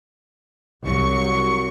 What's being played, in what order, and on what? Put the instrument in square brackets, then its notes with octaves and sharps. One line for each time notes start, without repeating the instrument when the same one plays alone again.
[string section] C2 F#3 C#6